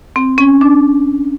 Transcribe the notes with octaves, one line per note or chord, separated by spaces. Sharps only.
C4
C#4
D4